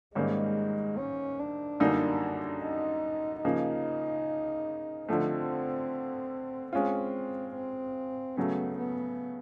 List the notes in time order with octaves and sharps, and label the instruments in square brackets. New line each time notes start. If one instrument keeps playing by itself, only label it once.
[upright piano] G#2 D#3 G3 A#3 C#4 [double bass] G#3
[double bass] C#4
D4
[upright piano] F#2 D3 G3 A#3 D#4
[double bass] D#4
[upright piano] C#3 F3 A#3 [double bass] D#4
[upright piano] D3 F3 A3 [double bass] C4
[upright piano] G#3 C#4 F4 [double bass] C4
[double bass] C4
[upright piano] C#3 F#3 A3 [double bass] B3
[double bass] B3